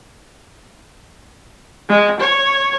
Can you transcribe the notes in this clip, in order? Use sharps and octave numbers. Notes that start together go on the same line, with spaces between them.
G#3
C#5